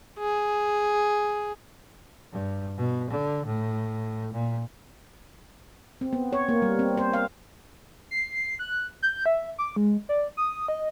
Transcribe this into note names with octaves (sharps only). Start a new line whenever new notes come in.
G#4
G2
B2
D3
A2
A#2
C4
B3
C#5
A#3
G3
C4
C5
F5
C7
F#6
G6
E5
D6
G#3
D5
D#6
D#5